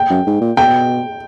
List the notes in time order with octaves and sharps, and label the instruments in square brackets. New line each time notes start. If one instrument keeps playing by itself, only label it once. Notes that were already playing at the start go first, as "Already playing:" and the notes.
Already playing: [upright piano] G5
[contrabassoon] F#2
G#2
A#2
[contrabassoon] B2 [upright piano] G5